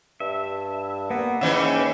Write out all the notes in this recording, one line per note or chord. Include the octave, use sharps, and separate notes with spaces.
G2 E5
A#3 B3
G#2 C#3 E3 E5 G5